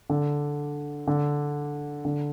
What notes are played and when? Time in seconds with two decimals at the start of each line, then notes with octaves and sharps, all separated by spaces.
0.10 D3
1.07 D3
2.05 D3